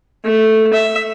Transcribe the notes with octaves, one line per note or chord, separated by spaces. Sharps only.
A3
E5